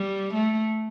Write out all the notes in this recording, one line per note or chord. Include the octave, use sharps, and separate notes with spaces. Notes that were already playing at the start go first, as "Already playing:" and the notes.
Already playing: G3
A3